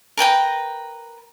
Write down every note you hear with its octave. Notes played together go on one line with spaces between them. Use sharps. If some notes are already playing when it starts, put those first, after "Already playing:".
A#4 B4 G5 A#5